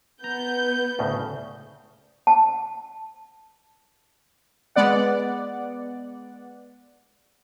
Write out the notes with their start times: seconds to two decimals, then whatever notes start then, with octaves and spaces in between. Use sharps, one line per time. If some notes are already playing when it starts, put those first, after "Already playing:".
0.24 B3 A#5 G6
0.99 D2 A2 C#3
2.27 A5
4.76 G#3 B3 D5 F#5